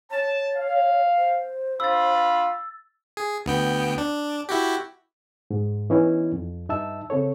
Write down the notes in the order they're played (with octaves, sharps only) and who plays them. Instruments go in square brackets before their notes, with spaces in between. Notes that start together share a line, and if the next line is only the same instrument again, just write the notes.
[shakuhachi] C#5 [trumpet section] A5
[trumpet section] F5
[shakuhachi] C5
[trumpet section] D4 F4 B5 [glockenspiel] E6 A6
[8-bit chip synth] G#4
D2 B3 G5
D4
E4 F#4 G4
[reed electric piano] G#2
E3 B3 C#4 D#4 E4
F2
G2 D#4 E5 A5 E6
C#3 C4 A4 C#5